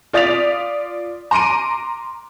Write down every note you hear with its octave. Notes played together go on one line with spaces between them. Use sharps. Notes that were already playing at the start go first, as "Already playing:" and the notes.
F4 D5 D#6 A6 B6 F7
A#5 C6 D6 D7 D#7